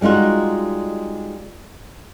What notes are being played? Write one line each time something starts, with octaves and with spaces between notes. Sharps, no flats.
G3 G#3 D#4 F4 F#4